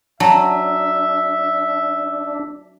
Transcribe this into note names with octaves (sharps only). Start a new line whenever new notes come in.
F#3 D4 E5 A5